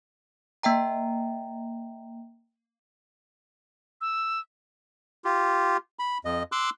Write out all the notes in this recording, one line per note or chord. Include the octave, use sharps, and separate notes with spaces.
A#3 E5 G5 A#5
E6
F4 G4
B5
F2 D#5
C6 D6 E6 F#6